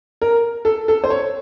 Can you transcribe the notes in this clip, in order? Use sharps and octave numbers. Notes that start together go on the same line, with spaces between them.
A#4
A4
A4
C5
C#5